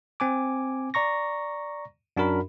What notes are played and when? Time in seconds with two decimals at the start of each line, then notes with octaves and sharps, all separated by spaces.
0.20 C4 G#5 D6
0.94 D5 A#5 C#6 A#6
2.17 F#2 D4 F#4 A#4 B5